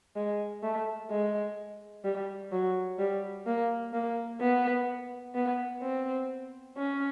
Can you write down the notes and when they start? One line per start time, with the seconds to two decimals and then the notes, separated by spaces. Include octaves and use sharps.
0.16 G#3
0.63 A3
1.10 G#3
2.05 G3
2.52 F#3
2.99 G3
3.47 A#3
3.93 A#3
4.40 B3
5.35 B3
5.82 C4
6.77 C#4